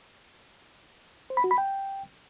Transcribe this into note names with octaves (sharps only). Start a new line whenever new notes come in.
C5
B5
F#4
B5
G5